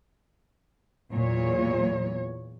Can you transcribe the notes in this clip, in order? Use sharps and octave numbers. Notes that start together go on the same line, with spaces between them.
E2 A#2 F#3 C#5